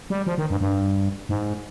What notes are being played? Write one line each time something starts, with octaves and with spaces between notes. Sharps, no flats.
G3
F3
D#3
G2
G2
G#2